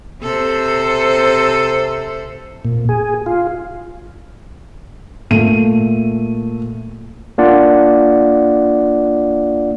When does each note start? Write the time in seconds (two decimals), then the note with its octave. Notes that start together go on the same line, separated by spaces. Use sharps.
0.22 C3 A4 C5
2.65 A#2
2.89 G#4
3.26 F4
5.31 A#2 A3 D#7
7.38 A#3 D4 F4 D5 F#5